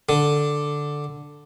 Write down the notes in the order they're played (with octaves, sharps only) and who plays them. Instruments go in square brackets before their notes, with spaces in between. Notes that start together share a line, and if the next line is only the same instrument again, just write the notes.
[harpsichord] D3